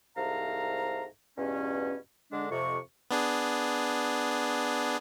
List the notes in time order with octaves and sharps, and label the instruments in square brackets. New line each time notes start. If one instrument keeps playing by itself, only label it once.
[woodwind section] C2 G#2 A3 F5 A#5
E2 G2 B2 C#4
D3 G#3 D4
F2 C3 C#6
[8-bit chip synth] B3 D4 G#4